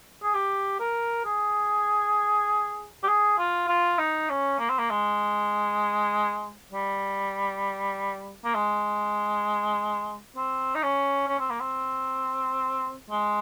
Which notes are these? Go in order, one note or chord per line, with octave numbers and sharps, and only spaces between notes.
G#4
G4
A#4
G#4
G4
G#4
F4
F4
D#4
C#4
A#3
C4
A#3
G#3
G3
A#3
G#3
C4
D#4
C#4
C#4
C4
A#3
C4
G#3